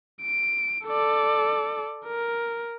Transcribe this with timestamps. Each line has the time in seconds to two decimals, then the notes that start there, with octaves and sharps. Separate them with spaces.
0.22 D7
0.86 A4 D5
2.06 A#4